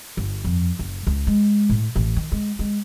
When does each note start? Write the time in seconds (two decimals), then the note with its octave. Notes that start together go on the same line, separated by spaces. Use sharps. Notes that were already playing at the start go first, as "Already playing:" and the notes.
0.17 G1
0.44 F2
0.79 F#1
1.07 C#2
1.27 G#3
1.70 A2
1.96 A1
2.16 D#3
2.32 G#3
2.59 G#3